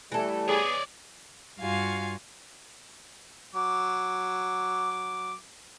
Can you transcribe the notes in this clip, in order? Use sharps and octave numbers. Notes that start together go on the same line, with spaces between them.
E3 G3 A3 A4
B3 G#4 C#5 D5
G2 F4 F#4 F5 G#5
F#3 D6